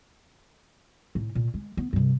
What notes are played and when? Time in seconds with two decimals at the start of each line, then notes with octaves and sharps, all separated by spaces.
1.15 A2
1.35 A#2
1.54 G#3
1.77 B3
1.93 G2 C3